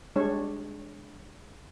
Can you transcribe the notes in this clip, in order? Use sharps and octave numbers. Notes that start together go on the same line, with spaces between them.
G3 G#3 D4 C#5